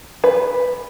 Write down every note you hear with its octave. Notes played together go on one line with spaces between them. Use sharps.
B4